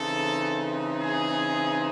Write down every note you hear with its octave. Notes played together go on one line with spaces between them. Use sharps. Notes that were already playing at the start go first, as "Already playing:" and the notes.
Already playing: C#3 E3 C4 D#4 A4
G#4